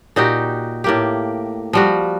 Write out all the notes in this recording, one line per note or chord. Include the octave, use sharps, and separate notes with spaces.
A#2 D#4 F#4 G4
A2 A#3 G4
F3 G3 F#4